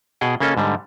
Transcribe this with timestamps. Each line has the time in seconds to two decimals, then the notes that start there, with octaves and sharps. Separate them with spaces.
0.21 B2 G#4 F#5 G5
0.40 C#3 A#3 C#4 A4 D#5
0.57 G#2 D3 G3